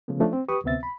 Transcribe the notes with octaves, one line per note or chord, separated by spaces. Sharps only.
C#3 F3 A3 B3
F3 A3 C#4 D4
C4
G4 B4 C#6 D#6
D2 C3 B3 C4 E5 A6
B5